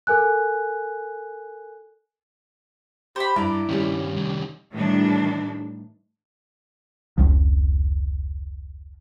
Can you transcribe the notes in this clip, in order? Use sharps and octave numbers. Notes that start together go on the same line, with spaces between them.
A4 A#4 G#5 F#6
G4 C5 B5
G2 E4 D5 A#5
G2 D#3 G3 C#4
C2 D#3
A2 D#3 E3 G3 D4
F1 C#2 F3